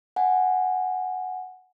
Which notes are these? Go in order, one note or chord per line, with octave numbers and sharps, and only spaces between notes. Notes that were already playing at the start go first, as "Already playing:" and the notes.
F#5 G#5